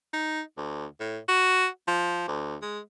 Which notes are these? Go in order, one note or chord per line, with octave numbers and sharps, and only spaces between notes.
D#4
D2
A2
F#4
F3
D2
G#3